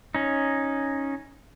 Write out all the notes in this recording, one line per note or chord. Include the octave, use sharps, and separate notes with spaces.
C#4 D#4